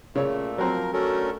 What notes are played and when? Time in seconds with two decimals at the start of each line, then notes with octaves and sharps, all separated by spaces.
0.15 A#2 C#3 A3 C#5
0.58 F3 F#3 C4 A#4 A#5
0.93 D3 A3 C#4 F#4 A4 A#4